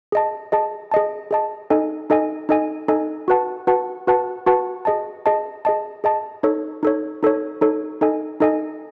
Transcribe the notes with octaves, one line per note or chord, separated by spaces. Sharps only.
G#4 D#5 A5
G#4 D#5 A5
G#4 D#5 A5
G#4 D#5 A5
D#4 A4 D#5 G#5
D#4 A4 D#5 G#5
D#4 A4 D#5 G#5
D#4 A4 D#5 G#5
F#4 B4 F#5 A5
F#4 B4 F#5 A5
F#4 B4 F#5 A5
F#4 B4 F#5 A5
G#4 D#5 A5
G#4 D#5 A5
G#4 D#5 A5
G#4 D#5 A5
D#4 A4 C#5
D#4 A4 C#5
D#4 A4 C#5
D#4 A4 C#5
D#4 A4 D#5 G#5
D#4 A4 D#5 G#5